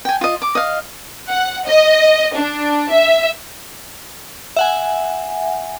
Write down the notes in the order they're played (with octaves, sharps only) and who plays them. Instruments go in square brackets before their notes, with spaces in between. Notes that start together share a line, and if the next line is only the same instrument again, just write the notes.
[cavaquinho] G5 G#5
F4 D#5
D6
D#5 F5
[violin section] F#5
D#5
D4
E5
[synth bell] E5 F#5 G#5